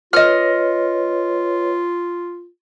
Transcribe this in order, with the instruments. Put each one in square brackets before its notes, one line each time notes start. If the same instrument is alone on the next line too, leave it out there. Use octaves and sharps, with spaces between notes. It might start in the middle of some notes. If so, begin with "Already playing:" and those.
[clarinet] F4 [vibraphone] B4 C#5 [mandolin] D#5 F6